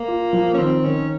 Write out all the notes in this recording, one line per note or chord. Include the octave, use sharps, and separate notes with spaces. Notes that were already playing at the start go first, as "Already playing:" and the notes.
Already playing: A#3
F4
F3
C#4
D#3 C4
D#3 C#4